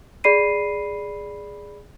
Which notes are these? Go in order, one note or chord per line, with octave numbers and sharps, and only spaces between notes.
G#4 D5 B5 C7 D#7